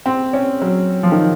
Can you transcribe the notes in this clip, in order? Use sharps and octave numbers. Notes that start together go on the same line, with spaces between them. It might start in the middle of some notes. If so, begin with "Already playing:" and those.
C4
C#4
F#3
F3
D#3